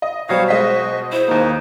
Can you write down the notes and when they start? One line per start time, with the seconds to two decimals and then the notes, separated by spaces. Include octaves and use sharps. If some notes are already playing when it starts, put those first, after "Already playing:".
0.02 D#5
0.29 B2 F#3 G3 C5 C#5 F5 D#6 A#6
0.48 G#3 F#4 D#5 B6
1.12 E4 C5
1.28 D#2 A#3 D#4